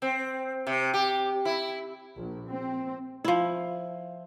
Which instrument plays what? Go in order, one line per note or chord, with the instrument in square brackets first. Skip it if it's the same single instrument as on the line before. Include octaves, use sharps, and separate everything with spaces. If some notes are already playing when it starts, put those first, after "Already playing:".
[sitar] C4
C3
G4
E4
[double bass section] A#1
C4
[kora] F3 E4